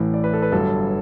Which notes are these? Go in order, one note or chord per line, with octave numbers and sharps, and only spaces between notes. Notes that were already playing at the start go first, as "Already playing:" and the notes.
Already playing: A1 A2 E3
D5
B4
A4
B4
G1 G2 F#3 A4